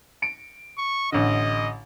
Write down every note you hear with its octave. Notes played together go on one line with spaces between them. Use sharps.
C#7 D7
C#6
A1 D3 D#5